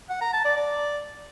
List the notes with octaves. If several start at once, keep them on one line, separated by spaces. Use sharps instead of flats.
F#5
A#5
A5
D5
D5